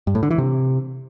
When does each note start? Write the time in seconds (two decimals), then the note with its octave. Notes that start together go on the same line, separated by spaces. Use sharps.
0.07 G2
0.15 A2
0.23 D3
0.30 E3
0.38 C3